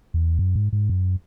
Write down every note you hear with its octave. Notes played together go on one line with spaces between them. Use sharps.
E2
F#2
G#2
G#2
F#2